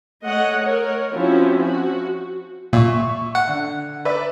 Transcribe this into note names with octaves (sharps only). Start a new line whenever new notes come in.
A3 C#5 D#5 F#5
A#4 C#5
F3 C4 C#4 E4 F#4
F#4
A#2 E5 C#6
F#5
D3
B4 D5 E5